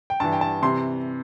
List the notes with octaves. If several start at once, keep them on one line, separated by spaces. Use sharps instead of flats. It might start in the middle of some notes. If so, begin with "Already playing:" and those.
G5
G2 E3 A5
G5
A5
C3 E3 C6